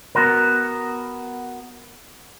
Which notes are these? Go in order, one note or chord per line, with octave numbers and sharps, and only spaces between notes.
B3 F#4 A#4